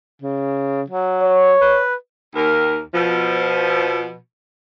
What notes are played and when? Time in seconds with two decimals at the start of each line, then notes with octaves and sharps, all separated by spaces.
0.22 C#3
0.90 F#3
1.23 C#5
1.61 B4
2.35 D#2 A#4
2.94 B2 F3